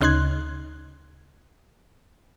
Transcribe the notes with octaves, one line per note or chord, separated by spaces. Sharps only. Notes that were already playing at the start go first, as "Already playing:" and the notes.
D2 C#3 D#4 C6 F#6 G#6